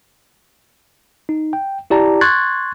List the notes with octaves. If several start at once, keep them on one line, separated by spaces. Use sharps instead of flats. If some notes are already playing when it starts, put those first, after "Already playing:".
D#4
G5
E4 G4 D5 A5 A#5
C6 C#6 F#6 G#6 A6